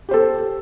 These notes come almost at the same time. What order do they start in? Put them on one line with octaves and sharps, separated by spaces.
G4 C5 A4